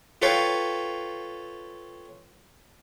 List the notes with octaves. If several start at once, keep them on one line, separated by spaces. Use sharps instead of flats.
F4 A4 B4 C#5 F5 G5